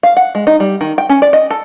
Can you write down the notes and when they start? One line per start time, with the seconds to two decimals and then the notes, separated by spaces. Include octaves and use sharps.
0.03 F5
0.17 F#5
0.35 G#3
0.47 D#4
0.60 G3
0.81 D#3
0.98 G5
1.09 C#4
1.22 D5
1.33 D#5
1.51 A4